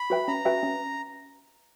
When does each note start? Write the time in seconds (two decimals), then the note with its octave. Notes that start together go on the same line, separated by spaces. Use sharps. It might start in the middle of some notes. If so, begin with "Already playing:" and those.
Already playing: B5
0.10 F#4 B4 E5 G5
0.28 C#4 A#5
0.45 F#4 B4 E5 G5
0.63 C#4